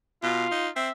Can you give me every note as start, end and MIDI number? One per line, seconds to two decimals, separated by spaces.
0.23 0.46 47
0.23 0.68 65
0.51 0.69 63
0.76 0.89 60
0.76 0.92 76